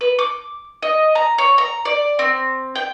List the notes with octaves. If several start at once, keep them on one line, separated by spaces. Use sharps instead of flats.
B4
D6
D#5
A#5
C#5
A#5
D5
C4
G5